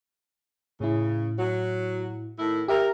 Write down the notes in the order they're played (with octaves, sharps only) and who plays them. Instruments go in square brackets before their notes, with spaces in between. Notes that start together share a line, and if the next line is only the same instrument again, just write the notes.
[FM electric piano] A2 E4 [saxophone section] C#3
[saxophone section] F#3
A2 D#3 E4
[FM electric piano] G4 E5 A#5 [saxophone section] A#4